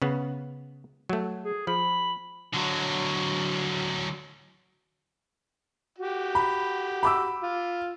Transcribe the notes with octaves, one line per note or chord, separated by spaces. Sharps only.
C#3 B3
F#3 A3
G#4
F3 B5
D3 F#3
F#4 G4
B5
B5 D6 E6
F4